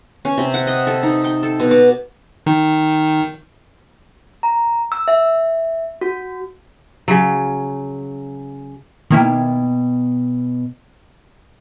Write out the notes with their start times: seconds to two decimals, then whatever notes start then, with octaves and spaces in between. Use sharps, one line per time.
0.25 C#4
0.37 C3
0.54 F#5
0.67 D#5
0.87 A4
1.03 D#4
1.24 G5
1.43 A4
1.59 B2
1.71 D6
2.46 D#3
4.43 A#5
4.92 E6
5.08 E5
6.01 F#4
7.08 C#3 F#3
9.11 B2 D#3 A#3 E4 G5